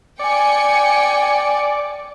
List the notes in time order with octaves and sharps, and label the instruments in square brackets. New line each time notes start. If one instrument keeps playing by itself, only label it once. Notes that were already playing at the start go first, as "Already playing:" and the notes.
[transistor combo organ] D5 [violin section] G5 G#5 C#7